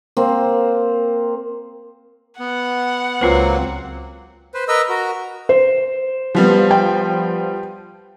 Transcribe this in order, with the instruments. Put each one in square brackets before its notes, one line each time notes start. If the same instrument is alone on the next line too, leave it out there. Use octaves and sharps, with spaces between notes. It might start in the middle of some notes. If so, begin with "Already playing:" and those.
[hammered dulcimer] A#3 C4
[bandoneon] B3 [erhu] F#5
[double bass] C#2 [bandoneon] F#3 A#3 C4 [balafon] F4 B4
[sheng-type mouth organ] B4 C5
A#4 B4 D#5 E6
F#4 A#4
[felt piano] C5
[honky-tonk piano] F3 G3 B3
[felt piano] G5